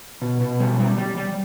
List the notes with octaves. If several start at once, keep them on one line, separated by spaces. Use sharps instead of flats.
B2
B2
G3
G3
G3
G3